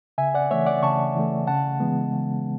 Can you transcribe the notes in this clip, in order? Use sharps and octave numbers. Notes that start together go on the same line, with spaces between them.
C#3 E5 G#5
D5 F#5
E3 A3 C#5 E5
D5 F#5
C#3 A5 C#6
E3 A3
C#3 F#5 A5
E3 G#3 B3
C#3